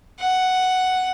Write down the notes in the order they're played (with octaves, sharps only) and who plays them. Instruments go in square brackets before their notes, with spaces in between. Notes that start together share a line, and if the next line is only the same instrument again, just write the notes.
[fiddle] F#5